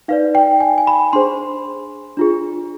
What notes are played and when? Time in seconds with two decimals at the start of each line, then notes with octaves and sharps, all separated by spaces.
0.08 D#4 B4 D5 F5
0.35 G5
0.60 G#5
0.78 G#5
0.87 B5
1.13 D4 G#4 C5 C6
2.17 D4 F4 G#4